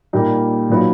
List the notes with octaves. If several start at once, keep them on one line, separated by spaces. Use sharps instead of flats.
A#2 G3 A#3 D#4
A#2 F#3 B3 D#4